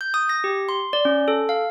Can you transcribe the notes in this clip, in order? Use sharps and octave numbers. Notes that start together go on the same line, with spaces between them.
G6
D#6
A#6
G4
C6
D5
C#4
A4
F5